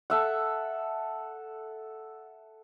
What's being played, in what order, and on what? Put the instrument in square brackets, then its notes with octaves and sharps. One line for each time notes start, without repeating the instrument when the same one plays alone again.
[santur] A4 E5 F#5